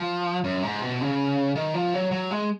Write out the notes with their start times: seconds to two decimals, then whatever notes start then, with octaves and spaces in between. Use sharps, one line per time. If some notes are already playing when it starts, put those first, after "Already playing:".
Already playing: F3
0.44 F#2
0.63 G#2
0.81 B2
1.01 C#3
1.55 D#3
1.74 F3
1.94 F#3
2.11 F#3
2.31 G#3